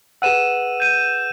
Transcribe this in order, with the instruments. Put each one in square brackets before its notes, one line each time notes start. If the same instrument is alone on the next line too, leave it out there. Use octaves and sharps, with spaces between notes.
[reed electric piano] G#4 B4 F#5 [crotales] E6 D#7 E7
[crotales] G6 D#7